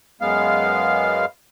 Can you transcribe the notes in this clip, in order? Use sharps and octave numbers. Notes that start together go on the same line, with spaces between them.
F#2 G#3 B3 F5